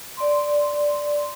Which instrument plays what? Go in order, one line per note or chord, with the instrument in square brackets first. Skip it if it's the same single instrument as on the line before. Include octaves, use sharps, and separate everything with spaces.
[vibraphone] D5 C6